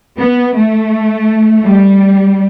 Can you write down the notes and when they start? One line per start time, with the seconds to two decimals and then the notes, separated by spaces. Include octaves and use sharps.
0.18 B3
0.56 A3
1.64 G3